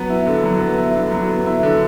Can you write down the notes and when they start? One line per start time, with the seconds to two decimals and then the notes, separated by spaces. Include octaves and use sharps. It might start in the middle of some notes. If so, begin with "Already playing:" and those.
Already playing: F#3 B3
0.10 E4
0.26 D3
0.44 F#3
0.61 B3
0.78 E4
0.95 D3
1.12 F#3
1.29 B3
1.46 E4
1.63 D3